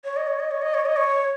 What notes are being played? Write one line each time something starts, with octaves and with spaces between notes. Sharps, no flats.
C#5
D#5
C#5
D#5
C#5
D#5
C#5
D#5
C#5